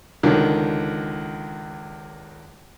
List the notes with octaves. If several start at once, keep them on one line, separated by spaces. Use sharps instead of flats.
C#2 D3 D#3